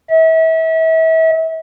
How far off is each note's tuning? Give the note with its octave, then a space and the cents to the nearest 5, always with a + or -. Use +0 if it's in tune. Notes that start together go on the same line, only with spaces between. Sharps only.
E5 -35